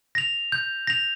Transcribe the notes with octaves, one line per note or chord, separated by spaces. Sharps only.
A#6 F7
G6
A#6 F7